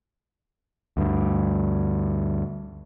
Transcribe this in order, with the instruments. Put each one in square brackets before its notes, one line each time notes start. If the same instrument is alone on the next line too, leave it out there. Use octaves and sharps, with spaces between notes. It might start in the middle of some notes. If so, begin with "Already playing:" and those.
[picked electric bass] D2 G2